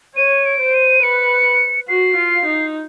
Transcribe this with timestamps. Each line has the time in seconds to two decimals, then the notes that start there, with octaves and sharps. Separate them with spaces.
0.16 C#5 D#7
0.46 D7
0.60 C5
0.74 D#7
1.03 B4 C#7
1.88 F#4 C7
2.16 F4
2.45 D#4